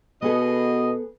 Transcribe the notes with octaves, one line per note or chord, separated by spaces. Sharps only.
B2 B3 G#4 A4 D#5